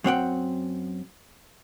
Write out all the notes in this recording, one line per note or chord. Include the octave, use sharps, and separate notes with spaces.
F#2 C4 F#5 G5